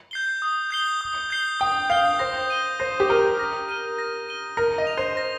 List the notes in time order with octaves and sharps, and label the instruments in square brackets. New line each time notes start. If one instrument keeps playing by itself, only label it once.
[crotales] G6 C7 G7
D#6
G6 C7 G7
D#6
G6 C7 G7
[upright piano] G5 [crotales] D#6
[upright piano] F5 [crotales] G6 C7 G7
[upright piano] C5 [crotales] A#6
[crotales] D#7 G7
[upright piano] C5 [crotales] A#6
[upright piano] G4
[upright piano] A#4 [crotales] D#7 G7
[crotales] A#6
D#7 G7
A#6
D#7 G7
[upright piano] A#4 [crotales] A#6
[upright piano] D#5
[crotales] F7
[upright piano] C5
[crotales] A#6